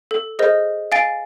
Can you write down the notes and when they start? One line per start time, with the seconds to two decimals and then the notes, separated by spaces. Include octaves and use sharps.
0.11 A4
0.39 G#4 A#4 C5 D#5
0.92 F5 G#5 A6 D7